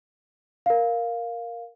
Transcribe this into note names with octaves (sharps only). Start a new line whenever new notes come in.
A#4 F5